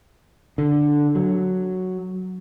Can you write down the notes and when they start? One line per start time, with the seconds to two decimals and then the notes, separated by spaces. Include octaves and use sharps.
0.58 D3
1.15 F#3